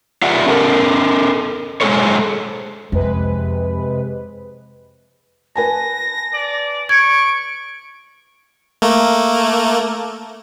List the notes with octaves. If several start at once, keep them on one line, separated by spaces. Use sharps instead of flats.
F4 G4 G#4 D5 E5 F#5
C#4 A4 A#4
G#3 G#4 A4 C5 C#5
F2 C3 G#3 B4
B4 G#5 A5 A#6
D5
C#6 G#6 D7
A3 A#3